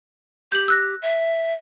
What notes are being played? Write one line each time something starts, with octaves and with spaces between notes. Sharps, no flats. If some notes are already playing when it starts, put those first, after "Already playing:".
G4 G6 F#7
E6 F#6 A#6
E5